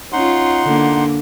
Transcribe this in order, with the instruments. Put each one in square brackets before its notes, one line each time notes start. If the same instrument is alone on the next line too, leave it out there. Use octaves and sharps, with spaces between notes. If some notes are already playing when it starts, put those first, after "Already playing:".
[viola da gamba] C#4 F4 [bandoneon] D#4 F#5 C6
[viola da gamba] D3 A#3